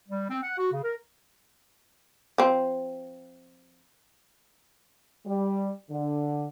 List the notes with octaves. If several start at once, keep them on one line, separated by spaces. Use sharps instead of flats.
G3
C4
F#5
F#4
C#3
A#4
F3 C4
G3
D3